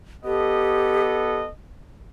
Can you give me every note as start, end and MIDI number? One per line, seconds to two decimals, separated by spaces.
0.25 1.49 59
0.25 1.39 67
0.25 1.49 69
0.25 1.49 75